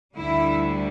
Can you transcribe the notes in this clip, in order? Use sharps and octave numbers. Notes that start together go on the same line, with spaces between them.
D2 D3 G3 E4